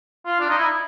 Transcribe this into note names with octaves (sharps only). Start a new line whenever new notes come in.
F4
D4
D#4
E4